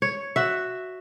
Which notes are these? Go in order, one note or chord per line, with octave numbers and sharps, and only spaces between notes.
C#5
F#4 E5